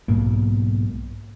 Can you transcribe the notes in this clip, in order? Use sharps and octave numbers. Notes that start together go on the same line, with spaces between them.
B1 G#2 B2 A#3